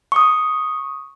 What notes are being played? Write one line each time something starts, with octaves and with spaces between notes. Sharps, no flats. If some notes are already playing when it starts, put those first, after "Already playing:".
C#6 D#6